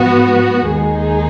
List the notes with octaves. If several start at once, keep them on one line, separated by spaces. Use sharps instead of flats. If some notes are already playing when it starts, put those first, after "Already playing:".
Already playing: G#2 F3 B3 F#4
D#2 D#3 G#3 D#4 G#4